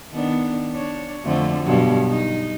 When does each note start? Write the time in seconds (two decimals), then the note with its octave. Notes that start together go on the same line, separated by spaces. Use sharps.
0.12 D#3 B3 D4
0.72 D4 C#5
1.25 F2 D3 A3
1.64 G2 B2 F#3
2.09 D#4